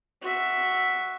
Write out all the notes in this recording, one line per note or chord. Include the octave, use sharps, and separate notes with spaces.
F#4 E5